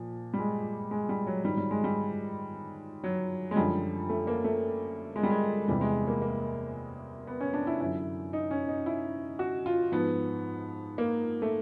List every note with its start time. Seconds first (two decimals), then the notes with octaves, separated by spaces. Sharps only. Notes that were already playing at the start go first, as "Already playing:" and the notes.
Already playing: A#2 F3
0.34 G3
0.39 G#3
0.91 G#3
1.09 G3
1.27 F#3
1.44 G#2 D#3 F#3 G3
1.57 G3
1.71 G#3
1.84 G3
3.04 F#3
3.51 G#3
3.56 F#2 D3 F3 G3
4.09 A3
4.27 A#3
4.44 A3
5.16 G#3
5.23 G3
5.30 G#3
5.68 E2 C3 E3 G3
5.81 G#3
6.07 A#3
6.22 A#3
7.27 B3
7.41 C#4
7.54 D4
7.67 E4
7.80 F#2 D3 F#3 E4
8.33 D#4
8.51 C#4
8.68 D#4
8.86 E4
9.39 F#4
9.66 F4
9.92 G#2 F3 B3
10.98 A#3
11.42 A3